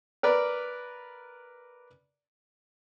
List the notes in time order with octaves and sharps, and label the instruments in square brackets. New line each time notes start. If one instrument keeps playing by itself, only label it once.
[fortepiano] A#4 B4 D5